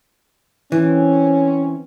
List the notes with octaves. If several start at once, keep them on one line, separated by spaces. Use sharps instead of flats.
E3 C4 C#4